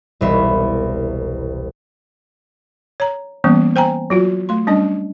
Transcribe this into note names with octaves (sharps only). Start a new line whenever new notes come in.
E1 C2 E5 B5
C#5 A#5
E3 G3 A#3 B3 C#4
C5 G5 G#5 A#5
F#3 F4 F#4
A3 C6
G3 C#4 D4 D#5